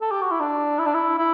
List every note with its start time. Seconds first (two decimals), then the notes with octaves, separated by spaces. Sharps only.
0.01 A4
0.11 G4
0.21 F#4
0.31 E4
0.40 D4
0.79 E4
0.86 D4
0.94 E4
1.18 E4